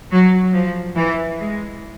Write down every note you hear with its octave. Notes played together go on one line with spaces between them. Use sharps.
F#3
F3
E3
G#3